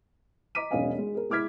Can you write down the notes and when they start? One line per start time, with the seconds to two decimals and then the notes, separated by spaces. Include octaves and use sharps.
0.55 D#5 A#5 D6 B6 D#7
0.71 E1 B1 C#4 D#5 F5 G#5
0.98 G#3
1.15 G#4 A#4
1.30 G#3 E4 D6 F6 G#6 B6